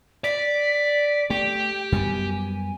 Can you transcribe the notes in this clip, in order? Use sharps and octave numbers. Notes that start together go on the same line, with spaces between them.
D5 B6
A3 G4 G5
F#2 G3 B3 G#5